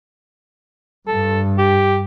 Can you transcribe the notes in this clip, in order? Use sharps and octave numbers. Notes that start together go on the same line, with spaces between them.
G2 A4
G4